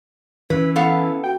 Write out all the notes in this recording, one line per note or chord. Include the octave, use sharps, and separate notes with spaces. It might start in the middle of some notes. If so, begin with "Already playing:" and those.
E3 C#4 B4
B3 A4 F5
F#4 G5